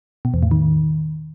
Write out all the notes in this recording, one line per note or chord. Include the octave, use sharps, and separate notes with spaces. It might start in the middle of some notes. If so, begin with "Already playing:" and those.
B2
E2
A2
D#3